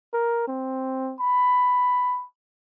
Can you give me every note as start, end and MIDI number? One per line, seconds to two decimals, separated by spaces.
0.13 0.46 70
0.48 1.14 60
1.20 2.25 83